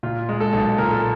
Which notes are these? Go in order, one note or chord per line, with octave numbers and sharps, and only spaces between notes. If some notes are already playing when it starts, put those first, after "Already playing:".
A#2 F4
G#3
A4
B1
A#2 A#4
A4